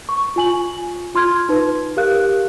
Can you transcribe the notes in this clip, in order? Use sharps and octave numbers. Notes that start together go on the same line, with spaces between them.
C#6
F4 G#5 F#7
F4 C6 F6 G#6
D#4 B4
G4 A#4 F5 F#6